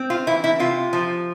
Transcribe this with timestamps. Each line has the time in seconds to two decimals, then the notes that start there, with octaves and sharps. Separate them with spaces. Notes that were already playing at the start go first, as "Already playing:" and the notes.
Already playing: C4
0.10 F4
0.27 E3 E4
0.44 E4
0.60 C3 F4
0.93 F3